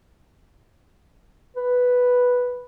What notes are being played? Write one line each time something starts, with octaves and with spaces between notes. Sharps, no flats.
B4